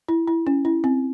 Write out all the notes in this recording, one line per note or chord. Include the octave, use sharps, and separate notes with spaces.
E4
E4
C#4
E4
C4